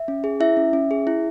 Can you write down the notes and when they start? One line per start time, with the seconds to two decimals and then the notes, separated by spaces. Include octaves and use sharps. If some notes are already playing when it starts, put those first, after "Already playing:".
Already playing: E5
0.08 C#4
0.24 G#4
0.40 E4 E5
0.57 C#4
0.73 C#4
0.91 G#4
1.07 E4